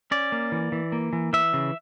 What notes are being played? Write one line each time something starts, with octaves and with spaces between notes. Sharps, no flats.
C#4 D5
A#3
E3
E3
A#3
E3
E3 E5
C#3